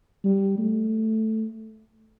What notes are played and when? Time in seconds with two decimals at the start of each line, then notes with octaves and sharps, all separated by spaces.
0.24 G3
0.58 A3